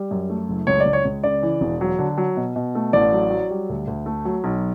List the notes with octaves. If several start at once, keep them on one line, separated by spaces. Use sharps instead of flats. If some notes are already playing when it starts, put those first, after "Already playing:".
Already playing: G3
F#2
A3
F#1
C#2 C#5
D5
C#2
C#5
C#2
C#3 D5
E3
E1
F#3
D3
F#3
B2
B2
A3
A1 D5
F#3
F#3
G3
D2
D2
A3
F#3
B1